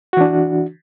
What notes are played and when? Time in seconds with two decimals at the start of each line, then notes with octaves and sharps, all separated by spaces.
0.13 F#4
0.17 E3
0.21 D4